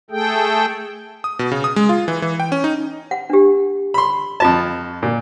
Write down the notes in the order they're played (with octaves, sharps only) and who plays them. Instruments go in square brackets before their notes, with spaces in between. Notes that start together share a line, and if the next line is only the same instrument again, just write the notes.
[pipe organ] A3 G#4 A4 G5
[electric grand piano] D#6
B2
C#3
D#6
G#3
F4
E3
E3
G5
C#4
D#4
[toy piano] F#5
D4 G4
[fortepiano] B5 C6
[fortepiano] F2 A5 [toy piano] F4 D#5
[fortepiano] A#2